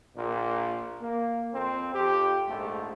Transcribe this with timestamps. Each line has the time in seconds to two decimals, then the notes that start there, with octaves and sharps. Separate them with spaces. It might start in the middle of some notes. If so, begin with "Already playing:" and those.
0.15 A#1 A#2
1.01 A#3
1.53 F2 C4
1.95 F2 G4
2.48 A#1 G#2 A3